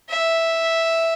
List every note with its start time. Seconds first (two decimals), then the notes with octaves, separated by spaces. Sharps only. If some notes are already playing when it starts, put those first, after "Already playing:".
0.10 E5